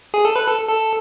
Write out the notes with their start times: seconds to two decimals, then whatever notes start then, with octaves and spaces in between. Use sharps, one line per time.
0.14 G#4
0.25 A4
0.36 B4
0.47 A4
0.69 A4